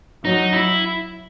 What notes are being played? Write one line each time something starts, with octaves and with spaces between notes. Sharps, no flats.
F#3 D#4
E4